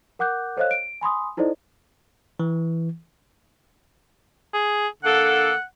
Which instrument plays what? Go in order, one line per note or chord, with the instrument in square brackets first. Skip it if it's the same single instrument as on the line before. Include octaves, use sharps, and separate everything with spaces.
[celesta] A#4 F#5 D6 F#6 G6
A4 C5 C#5 D#5 F5 F#6
D7
G#5 B5 C6 D#6
D#4 E4 A4 C5 D5 D#5
[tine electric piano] E3
[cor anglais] G#4
[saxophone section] D3 A#3 A4 [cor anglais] F#5